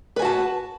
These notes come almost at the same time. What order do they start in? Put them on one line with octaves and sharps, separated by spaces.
B4 G#5 F#4 A5